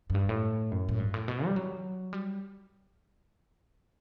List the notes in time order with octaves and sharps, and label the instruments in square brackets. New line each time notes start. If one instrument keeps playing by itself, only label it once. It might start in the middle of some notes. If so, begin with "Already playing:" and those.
[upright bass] F#2
G2
A2
F#2
A2
G2
A2
B2
G3
F#3
G3